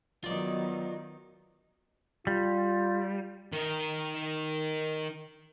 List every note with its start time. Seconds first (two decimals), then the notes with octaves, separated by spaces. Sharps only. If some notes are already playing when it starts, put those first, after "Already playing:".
0.24 D#3 F#3 B3 D#4 F4 D5
2.27 G3 F4
3.53 D#3 A#4